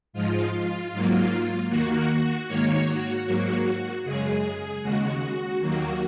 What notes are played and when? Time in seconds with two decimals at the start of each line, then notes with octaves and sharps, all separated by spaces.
0.13 G#2 F3 G#3 F4
0.92 G#2 F#3 A#3
1.69 D#2 D#3 A#3 F#4
2.48 G#2 D#3 A#3 C#5
2.87 F#4
3.26 G#2 F#3 A#3
4.03 F#2 C#3 G#3 G#4
4.82 D#2 C#3 G#3 F#4
5.61 D#2 D#3 F#3 A#3